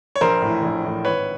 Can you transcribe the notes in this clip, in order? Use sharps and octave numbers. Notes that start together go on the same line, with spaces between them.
C#5
A#1 A#4 C5
A2 E3
A#1
A2 E3
G#1 B4 C#5